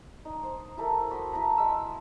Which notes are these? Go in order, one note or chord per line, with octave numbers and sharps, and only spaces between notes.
D#4
C5
E4 G4 A4 A#4
F#4 D#5 B5 C6
E4 B4 A5 A#5
G#3 E6